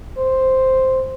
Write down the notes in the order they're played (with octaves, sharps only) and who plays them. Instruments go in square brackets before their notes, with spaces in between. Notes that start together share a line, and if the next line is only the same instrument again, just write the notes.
[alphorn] C5